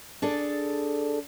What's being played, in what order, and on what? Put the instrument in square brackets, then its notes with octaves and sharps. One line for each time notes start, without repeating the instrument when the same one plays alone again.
[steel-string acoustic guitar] D4 G#4 A4 D5